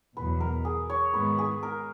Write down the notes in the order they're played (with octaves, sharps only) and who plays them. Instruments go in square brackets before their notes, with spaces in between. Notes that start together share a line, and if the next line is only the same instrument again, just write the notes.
[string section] E2 B2 F#3 [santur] B4
[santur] A#4
G#4
C#5
[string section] G#2 D#3 G#3 B3 [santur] B4
[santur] G#4
A#4